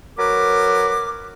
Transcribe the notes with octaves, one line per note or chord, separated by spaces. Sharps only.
F#3 A#4 B4 D6